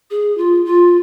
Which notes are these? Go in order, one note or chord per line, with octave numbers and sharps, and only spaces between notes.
G#4
F4
F4